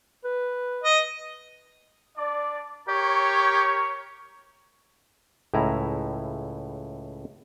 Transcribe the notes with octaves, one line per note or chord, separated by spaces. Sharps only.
B4
D#5
D4 D5
G4 A#4 C#5
C#2 A2 E4 G#5 A#5